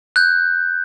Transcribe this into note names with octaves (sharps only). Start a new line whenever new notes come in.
F#6 G6